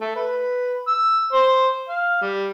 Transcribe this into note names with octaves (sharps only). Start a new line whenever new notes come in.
A3
B4
E6
C5
F5
G3